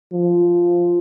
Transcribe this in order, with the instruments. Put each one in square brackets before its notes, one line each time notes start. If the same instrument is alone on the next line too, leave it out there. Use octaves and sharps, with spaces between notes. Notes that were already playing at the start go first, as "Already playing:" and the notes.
[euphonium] F3